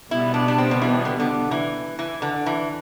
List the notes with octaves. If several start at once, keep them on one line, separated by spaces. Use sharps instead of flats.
B2 G3 B3 E4
D4
D4
C4
D3
E3
D3
D3
E3
E3
D3
E3